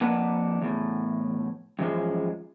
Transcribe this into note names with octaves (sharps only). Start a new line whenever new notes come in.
F2 A#3 D4 B4 F#5
E2 A2
F#2 E3 F3 G#3